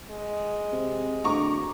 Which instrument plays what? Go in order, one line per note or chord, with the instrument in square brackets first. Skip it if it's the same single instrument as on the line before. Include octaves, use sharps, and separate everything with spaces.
[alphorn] G#3
[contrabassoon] C3
[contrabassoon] D2 [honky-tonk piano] A#5 C#6 D6